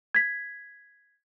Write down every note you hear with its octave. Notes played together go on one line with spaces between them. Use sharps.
G#6 B6